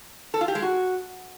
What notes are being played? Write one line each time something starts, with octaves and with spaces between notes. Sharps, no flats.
A4
F4
G4
G#3
F#4